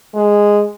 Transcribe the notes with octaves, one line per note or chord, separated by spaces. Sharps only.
G#3